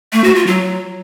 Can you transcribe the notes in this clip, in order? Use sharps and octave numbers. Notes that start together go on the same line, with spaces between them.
A3
F#4
F4
F#3